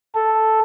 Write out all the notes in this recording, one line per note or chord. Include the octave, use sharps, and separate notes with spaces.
A4